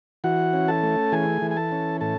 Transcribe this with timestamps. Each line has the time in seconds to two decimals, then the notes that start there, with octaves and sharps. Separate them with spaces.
0.24 E3 F#4 F#5
0.53 C#4
0.68 A4 A5
0.83 A3
1.12 E3 G#4 G#5
1.42 E3
1.51 G#5
1.57 A4 A5
1.72 C#4
2.01 A2 A4 A5